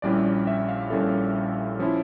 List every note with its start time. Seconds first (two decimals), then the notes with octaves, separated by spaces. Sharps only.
0.02 A#1 A#2 G3 C#4 E4 D5
0.24 D5
0.47 E5
0.68 F5
0.90 A#1 A#2 G3 C#4 E4 A4
1.80 F3 C#4 E4